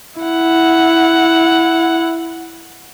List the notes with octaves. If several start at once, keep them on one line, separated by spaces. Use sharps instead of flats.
E4 F#5